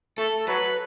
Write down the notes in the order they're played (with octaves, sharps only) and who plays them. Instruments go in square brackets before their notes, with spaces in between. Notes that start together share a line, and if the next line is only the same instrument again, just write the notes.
[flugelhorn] A3 [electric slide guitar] A4
[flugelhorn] F#3 [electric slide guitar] B4